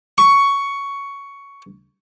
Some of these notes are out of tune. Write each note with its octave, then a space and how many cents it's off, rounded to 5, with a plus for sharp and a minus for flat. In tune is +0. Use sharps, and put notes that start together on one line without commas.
C#6 +10